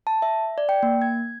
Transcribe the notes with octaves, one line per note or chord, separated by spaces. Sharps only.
A5
E5
D5
G5
A#3
G#6